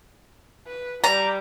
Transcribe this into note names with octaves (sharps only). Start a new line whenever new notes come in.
B4
G3 A#5